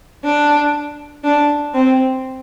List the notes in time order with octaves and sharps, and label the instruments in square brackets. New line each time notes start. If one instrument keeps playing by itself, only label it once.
[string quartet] D4
D4
C4